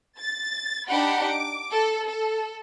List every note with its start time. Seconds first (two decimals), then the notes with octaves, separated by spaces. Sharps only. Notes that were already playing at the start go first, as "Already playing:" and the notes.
0.19 A6
0.90 D4 D#4 G4 F#5 B5
1.29 D6
1.71 A4
2.07 A4